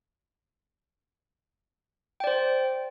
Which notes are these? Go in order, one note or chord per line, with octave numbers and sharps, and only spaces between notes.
C5 D5 G5